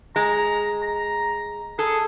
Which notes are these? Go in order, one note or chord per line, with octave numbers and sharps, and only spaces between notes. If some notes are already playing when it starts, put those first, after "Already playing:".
G#3 A#5
A#5
G#4 A4